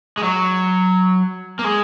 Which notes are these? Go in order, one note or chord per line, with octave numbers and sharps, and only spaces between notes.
G#3
F#3
A#3
G#3